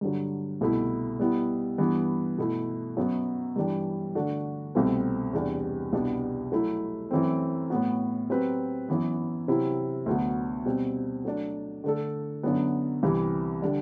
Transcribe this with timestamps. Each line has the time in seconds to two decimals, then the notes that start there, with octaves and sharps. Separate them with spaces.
0.01 G2 D3 F#3
0.61 C2 B2 A3 E4
1.20 G3 B3 E4
1.78 G2 E3 B3
2.38 B2 A3 E4
2.97 F#2 F#3 B3 F#4
3.56 G2 E3 G3 D4 G4
4.15 D3 A3 D4 F#4
4.75 C2 B2 A3 C4
5.33 E2 C3 G3 D4
5.93 C2 B2 G3 B3 D4
6.52 F#3 A3 E4
7.11 F#2 E3 A3 C4
7.70 A2 F#3 B3 F#4
8.30 F#3 C4 G4 B4
8.88 F#2 E3 B3
9.48 C3 F#3 C4 E4
10.06 D2 D3 F#3 B3 F#4
10.66 B2 G3 C4
11.25 F#3 A3 D4
11.84 D3 A3 D4 A4
12.43 F#2 D3 F#3 B3
13.03 C2 C3 E3 G3
13.62 D3 G3 D4